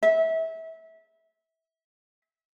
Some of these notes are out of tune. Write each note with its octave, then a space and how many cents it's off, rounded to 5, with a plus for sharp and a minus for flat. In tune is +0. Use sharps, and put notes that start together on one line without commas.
E5 -25